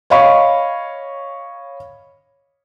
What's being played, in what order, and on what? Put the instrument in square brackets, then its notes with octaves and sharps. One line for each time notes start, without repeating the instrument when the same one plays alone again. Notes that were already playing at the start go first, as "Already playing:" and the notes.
[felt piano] C#5 D#5 F5 B5 C#6